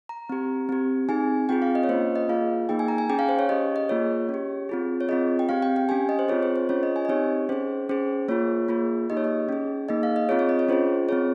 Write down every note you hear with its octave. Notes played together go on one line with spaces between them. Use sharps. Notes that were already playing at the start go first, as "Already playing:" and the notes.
A#5
C4 G4
C4 G4
C4 D#4 G#4 G#5
C4 F4 G#4 G5
F5
D#5
C#5
A#3 C#4 F4 C5
D#5
A#3 F4 G#4 F5
A#3 D#4 G#4 G5
G#5
A#5
G#5
C#4 G#4 G5
F5
C5
C#5
C#4 G4 D#5
D#5
A#3 F4 G#4 C#5
C#4
G4
C4 F4 G#4
C#5
C4 F4 G#4 D#5
G5
C4 G4 F5
G5
G5
C#4 G4 G#5
D#5
C5
C4 F4 G#4 C#5
C5
C5
C#4 F4 G#4 C#5
D#5
G#5
D#5
C4 D#4 G4 C#5
C#4 G#4 C5
C#4 G#4 C5
A#3 F4 G#4 C#5
A#3 F4 G#4
A#3 D#4 G4 D#5
C#5
D#5
C#4 G#4
A#3 D#4 G#4 D#5
F5
D#5
C4 F4 G#4 C#5
C#5
D#5
C#5
C#4 F4 G#4 C5
C4 F4 G#4 C#5